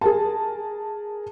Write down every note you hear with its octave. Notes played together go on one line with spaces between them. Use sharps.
G#4 A#4 A5